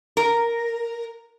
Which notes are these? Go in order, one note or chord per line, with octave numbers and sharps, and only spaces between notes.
A#4